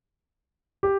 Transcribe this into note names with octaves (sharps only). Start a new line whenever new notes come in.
G4